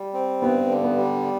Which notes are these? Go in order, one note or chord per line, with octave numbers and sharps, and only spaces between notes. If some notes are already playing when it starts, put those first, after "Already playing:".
Already playing: G3
C4
G2 B3
D3
B3
G3